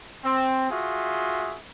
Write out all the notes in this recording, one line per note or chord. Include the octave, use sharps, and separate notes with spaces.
C4
F4 F#4 G#4 E5